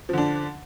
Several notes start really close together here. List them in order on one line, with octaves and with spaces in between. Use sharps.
F3 D3 D4